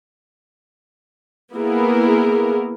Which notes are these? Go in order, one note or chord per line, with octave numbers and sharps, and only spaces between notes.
A#3 B3 E4 G#4 A#4